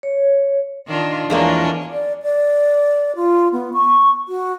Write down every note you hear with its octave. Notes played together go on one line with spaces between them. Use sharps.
C#5
D#3 D4 F4
E2 F3 G#3 A#3 C#4 D4
D5
D5
F4
B3
C#6
F#4